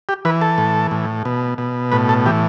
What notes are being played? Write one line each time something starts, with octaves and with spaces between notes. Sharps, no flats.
G4
E3 B4
A4
A2
A2
B2
B2
A2 B4
A4
E3 G4